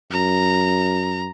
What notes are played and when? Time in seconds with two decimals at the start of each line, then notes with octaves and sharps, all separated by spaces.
0.12 F#2 A#5